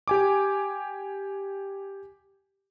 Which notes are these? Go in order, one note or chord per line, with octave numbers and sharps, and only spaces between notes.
G4 G#5 D6